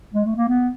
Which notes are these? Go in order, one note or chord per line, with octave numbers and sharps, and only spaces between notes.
G#3
A3
A#3
B3